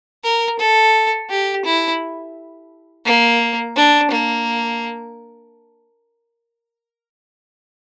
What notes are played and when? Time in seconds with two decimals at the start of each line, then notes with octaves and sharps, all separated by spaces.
0.24 A#4
0.59 A4
1.29 G4
1.65 E4
3.06 A#3
3.76 D4
4.11 A#3